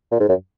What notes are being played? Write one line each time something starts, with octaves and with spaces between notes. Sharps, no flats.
A#2
G#2
F#2